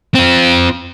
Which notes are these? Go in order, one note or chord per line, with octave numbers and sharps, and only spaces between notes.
C4 F4